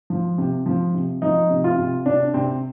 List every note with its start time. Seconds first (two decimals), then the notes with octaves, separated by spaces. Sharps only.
0.10 F3
0.38 C3
0.66 F3
0.94 C3
1.22 F3 D#4
1.50 C3
1.64 F4
1.78 C3
2.06 C3 D4
2.34 C3 C4